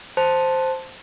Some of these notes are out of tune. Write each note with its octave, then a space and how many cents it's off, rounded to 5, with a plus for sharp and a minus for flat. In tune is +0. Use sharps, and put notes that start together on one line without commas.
C5 +0 A5 +0